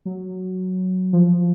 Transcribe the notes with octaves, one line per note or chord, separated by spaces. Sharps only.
F#3
F3